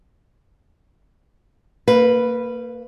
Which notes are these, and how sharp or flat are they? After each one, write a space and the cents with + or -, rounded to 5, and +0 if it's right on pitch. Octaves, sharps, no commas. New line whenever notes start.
A#3 -25 B4 +0 F5 +20